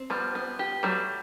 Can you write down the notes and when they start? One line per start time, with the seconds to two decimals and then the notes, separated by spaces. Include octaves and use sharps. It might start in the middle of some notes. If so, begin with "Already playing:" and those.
Already playing: C4
0.10 F3 G3 B3
0.35 B3
0.59 G4
0.83 F#3 G3 A3